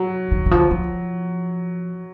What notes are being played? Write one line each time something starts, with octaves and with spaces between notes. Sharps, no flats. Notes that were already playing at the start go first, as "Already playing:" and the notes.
Already playing: F#3
D#3
D#3
F3
F3